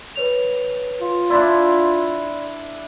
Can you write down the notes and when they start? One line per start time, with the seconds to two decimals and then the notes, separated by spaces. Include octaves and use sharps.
0.16 B4 C#5 F7
1.01 F4
1.30 D4 E4 D5 C6 A6